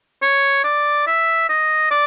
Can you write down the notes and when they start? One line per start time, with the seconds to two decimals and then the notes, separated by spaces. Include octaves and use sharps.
0.22 C#5
0.64 D5
1.07 E5
1.49 D#5
1.91 D5